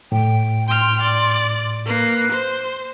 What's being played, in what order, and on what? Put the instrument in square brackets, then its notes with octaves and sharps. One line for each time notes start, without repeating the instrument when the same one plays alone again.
[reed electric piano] A2 [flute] G5
[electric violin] G5 F6 [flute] C6
[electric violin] D5
[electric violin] A#3 C7 [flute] B4
[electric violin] C5